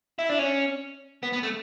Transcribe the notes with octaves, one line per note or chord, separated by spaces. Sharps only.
E4
D4
C#4
B3
B3
A3